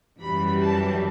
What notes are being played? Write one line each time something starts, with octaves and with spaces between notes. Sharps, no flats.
F#2 E3 G3 B5
A5